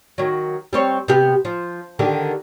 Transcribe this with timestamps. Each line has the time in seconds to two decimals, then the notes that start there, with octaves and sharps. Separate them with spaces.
0.18 D#3 F#3
0.73 G3 C4 C#5
1.08 C3 B3 G4
1.45 F3
1.99 D3 D#3 G4